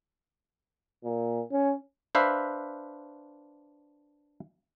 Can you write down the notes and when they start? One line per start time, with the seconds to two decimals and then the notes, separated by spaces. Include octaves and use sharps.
1.04 A#2
1.52 C#4
2.15 D4 B4 C5 E5 F5